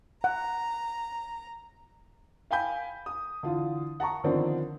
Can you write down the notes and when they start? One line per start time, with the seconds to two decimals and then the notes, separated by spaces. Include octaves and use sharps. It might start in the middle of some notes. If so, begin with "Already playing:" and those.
0.24 F#5 A#5
2.51 F5 G5 G#5 B5 G6
3.06 D#6
3.43 D3 E3 F4
4.00 F#5 A5 A#5 C#6
4.24 D3 D#3 F3 B3 C4 D4